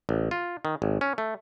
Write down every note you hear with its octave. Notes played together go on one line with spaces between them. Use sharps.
A1
F4
D#3
G#1
C#4
A3